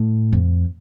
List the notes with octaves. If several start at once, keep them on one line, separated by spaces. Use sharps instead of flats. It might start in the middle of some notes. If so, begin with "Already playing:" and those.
Already playing: A2
F2